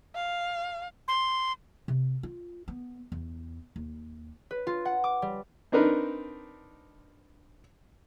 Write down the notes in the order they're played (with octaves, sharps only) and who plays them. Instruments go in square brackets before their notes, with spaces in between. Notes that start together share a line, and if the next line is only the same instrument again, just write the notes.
[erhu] F5
[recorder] C6
[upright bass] C3
F4
B3
E2
D#2
[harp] B4
F4
F#5
D6
G3
[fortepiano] C4 D4 D#4 A#4 B4